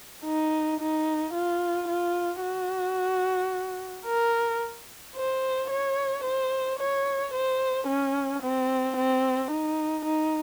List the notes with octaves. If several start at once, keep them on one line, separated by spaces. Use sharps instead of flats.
D#4
D#4
F4
F4
F#4
A#4
C5
C#5
C5
C#5
C5
C#4
C4
C4
D#4
D#4